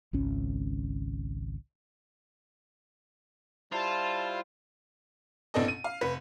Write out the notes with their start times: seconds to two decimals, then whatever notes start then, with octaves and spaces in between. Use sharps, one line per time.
0.13 G#1 C#2 C#4
3.72 G3 E4 F4 C5 A5
5.54 A1 B2 C4 D4 A4 D#5
5.68 D#7
5.84 F5
6.01 F1 B4